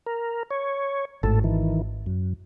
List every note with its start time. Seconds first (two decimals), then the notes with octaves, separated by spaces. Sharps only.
0.06 A#4
0.50 C#5
1.23 G#1 A2 A4
1.44 D#3 E3
2.06 F#2